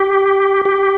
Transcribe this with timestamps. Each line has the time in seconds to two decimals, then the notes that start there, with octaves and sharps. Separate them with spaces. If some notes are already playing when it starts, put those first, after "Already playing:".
Already playing: G4
0.65 G4